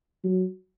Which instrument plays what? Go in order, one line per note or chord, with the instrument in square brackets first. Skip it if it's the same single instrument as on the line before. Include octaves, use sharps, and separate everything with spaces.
[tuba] F#3